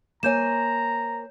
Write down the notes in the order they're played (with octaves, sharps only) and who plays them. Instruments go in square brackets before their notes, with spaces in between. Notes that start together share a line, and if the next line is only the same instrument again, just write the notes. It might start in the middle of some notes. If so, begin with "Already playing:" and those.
[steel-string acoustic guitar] A#3 C5 G#5 [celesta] C#5 G6 E7 [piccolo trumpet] A#5